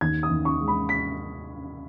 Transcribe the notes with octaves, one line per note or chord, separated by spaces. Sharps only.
D#2 G#6
D#6
D#2
C#6
G#3
B5
B6